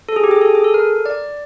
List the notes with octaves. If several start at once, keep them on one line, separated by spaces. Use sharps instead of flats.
A4
G#4
G4
G#4
A4
G#4
A4
A#4
D5